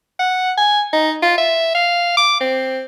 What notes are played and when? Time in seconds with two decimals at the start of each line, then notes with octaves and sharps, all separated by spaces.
0.19 F#5
0.58 G#5
0.93 D#4
1.23 F4
1.38 E5
1.75 F5
2.17 D6
2.41 C4